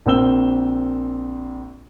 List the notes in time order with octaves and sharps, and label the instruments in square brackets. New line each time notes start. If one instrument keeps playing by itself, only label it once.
[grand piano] A#1 A#3 C4 E6 G7